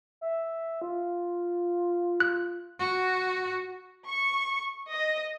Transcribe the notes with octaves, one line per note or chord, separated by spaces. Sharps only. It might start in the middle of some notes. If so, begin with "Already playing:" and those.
E5
F4
F#6
F#4
C#6
D#5